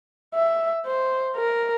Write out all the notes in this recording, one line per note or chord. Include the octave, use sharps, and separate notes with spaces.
E5
C5
A#4